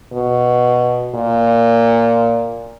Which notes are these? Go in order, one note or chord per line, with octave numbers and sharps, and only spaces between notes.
B2
A#2